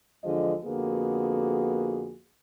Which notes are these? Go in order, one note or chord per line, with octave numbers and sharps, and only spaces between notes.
E2 D3 F3 G#3 D#5
F2 D3 A#3 B3 F#4 G#4